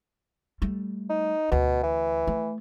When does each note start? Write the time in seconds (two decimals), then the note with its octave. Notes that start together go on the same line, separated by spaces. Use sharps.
0.62 G3 A3
1.10 D#4
1.52 D2 B2
1.83 E3
2.27 A3